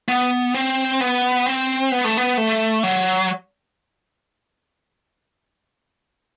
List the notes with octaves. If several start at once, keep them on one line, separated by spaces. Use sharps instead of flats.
B3
C4
B3
C4
B3
A3
B3
A3
F#3